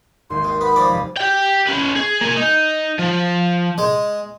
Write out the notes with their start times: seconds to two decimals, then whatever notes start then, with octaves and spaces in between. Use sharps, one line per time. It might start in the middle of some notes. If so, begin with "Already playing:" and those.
0.30 G#1 D#2 C6
0.44 D#3
0.61 B3 B5
0.76 F3 A#3 D5
0.89 F1
1.17 G4 G5
1.67 C#4 B4
1.96 G#4
2.21 A#3 G#5
2.37 D#4
2.99 F3
3.78 G#3